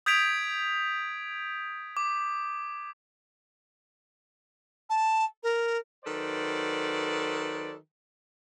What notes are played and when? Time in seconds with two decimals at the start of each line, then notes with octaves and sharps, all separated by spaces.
0.06 D#6 G6 G#6 B6 D7 F7
1.97 D6
4.89 A5
5.43 A#4
6.05 D#3 F#3 A4 B4 C5 D5